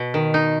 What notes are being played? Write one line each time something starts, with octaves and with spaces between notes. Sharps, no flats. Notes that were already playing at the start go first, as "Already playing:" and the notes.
Already playing: B2
D#3
D#4